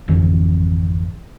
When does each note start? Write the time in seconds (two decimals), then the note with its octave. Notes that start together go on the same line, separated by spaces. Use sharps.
0.08 G#1 F2 D3 E3